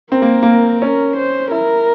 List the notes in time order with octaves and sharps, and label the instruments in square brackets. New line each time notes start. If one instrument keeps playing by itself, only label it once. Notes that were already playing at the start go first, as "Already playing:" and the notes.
[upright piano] C4 [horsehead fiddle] A#4
[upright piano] A#3
A#3
[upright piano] C#4 [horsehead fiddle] A#4
[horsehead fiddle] C5
[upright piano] E4 [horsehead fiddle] A#4